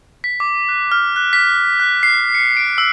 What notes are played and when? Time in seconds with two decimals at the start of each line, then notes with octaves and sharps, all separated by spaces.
0.24 B6
0.40 D6
0.69 F#6
0.92 F6
1.16 F#6
1.33 B6
1.80 F#6
2.03 C7
2.35 C#7
2.57 D7
2.78 E6